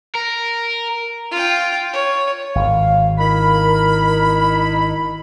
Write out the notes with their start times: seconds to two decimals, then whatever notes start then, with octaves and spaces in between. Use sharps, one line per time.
0.15 A#4
1.32 F4 G5
1.93 C#5
2.55 G#1 F5
3.19 D#4 E4 A#4 B5